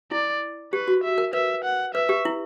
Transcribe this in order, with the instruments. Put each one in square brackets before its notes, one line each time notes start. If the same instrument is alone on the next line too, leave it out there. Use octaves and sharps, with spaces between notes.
[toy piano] E4 [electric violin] D5
[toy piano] G4 [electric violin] B4
[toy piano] F#4
[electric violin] E5
[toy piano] A#4
[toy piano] B4 [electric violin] E5
[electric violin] F#5
[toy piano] B4 [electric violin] E5
[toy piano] G4
E4